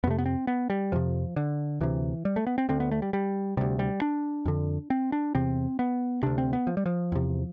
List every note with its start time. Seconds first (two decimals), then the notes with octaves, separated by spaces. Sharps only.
0.04 F2 B3
0.07 C3 A3
0.18 B3
0.26 C4
0.47 B3
0.70 G3
0.92 F2 C3 F3
1.36 D3
1.81 D2 C3 E3
2.25 G3
2.36 A3
2.47 B3
2.58 C4
2.69 D2 D3 C4
2.80 B3
2.91 A3
3.02 G3
3.13 G3
3.57 D2 C3 G3
3.79 G3
4.02 D4
4.45 F2 D3
4.90 C4
5.12 D4
5.35 E2 C3 C4
5.79 B3
6.23 D2 C3 D4
6.38 C4
6.53 B3
6.67 F3
6.77 G3
6.86 F3
7.12 E2 C3